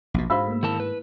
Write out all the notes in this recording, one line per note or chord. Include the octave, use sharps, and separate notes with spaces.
A#1 B2
G#2 D4 F#4 C5 F5 B5 E6
A3 A#3
D#3 E4 A#4 A5
B4